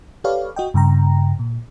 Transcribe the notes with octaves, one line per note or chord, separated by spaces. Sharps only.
G4 A4 B4 C#5 D5 F5
F#4 D#5 G5
G2 C#3 G5 A#5
A#2